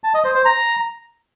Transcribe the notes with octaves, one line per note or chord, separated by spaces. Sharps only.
A5
D#5
C5
C5
A#5